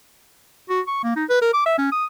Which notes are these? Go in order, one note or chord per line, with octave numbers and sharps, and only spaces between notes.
F#4
C#6
A#3
D#4
B4
A#4
D6
E5
C#4
D#6